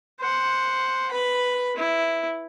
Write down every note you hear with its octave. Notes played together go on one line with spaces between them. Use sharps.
C5 F#5
B4 B5
E4